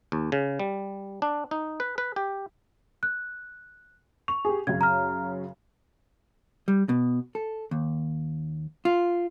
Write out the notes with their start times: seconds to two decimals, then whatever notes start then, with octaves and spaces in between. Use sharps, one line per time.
0.12 D#2
0.32 C#3
0.59 G3
1.22 D4
1.51 D#4
1.80 B4
1.98 B4
2.16 G4
3.03 F#6
4.28 C#6 F7
4.45 G4 G#4
4.67 F#2 C#3 G#6
4.81 A#5 F6
6.68 G3
6.89 B2
7.35 A4
7.71 D#2
8.85 F4